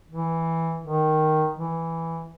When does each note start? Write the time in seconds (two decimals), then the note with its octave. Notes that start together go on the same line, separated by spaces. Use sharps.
0.10 E3
0.85 D#3
1.58 E3